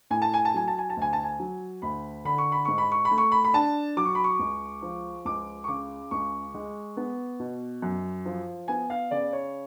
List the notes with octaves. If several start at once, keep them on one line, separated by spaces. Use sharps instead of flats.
A2 G#5
A5
G#5
A5
F#3 G#5
A5
G#5
A5
D2 G#5
A5
G#5
F#3
D2 B5
D3 B5
C#6
B5
G#2 C#6
B5
C#6
B5
A3
C#6
B5
B5
D4 A5
F#3 D6
C#6
B5
C#6
C#2
F3
C#2 D6
C#6
C#3 D6
C#2 C#6
G#3
B3
B2
F#2
F3
B3 G#5
F5
C#3 D5
C#5